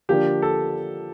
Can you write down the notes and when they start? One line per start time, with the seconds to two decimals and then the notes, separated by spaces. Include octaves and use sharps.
0.09 D3 F3 A#3 D4 G4
0.42 A4